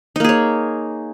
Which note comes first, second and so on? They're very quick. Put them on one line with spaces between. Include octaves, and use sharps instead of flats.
D#4 A#3 G#4 C#5